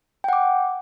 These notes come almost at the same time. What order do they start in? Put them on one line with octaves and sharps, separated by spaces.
G5 F#5 D6